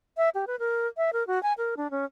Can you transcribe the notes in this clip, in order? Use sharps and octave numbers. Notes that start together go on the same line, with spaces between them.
E5
G4
B4
A#4
E5
A#4
F#4
G#5
A#4
D4
C#4